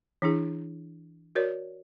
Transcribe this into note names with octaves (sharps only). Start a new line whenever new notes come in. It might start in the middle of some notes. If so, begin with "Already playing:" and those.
E3 D4 E4 G#4
F#4 A#4 C#5 D5